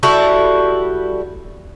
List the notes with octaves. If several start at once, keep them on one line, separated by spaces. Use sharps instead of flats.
G3 E4 F#4 A4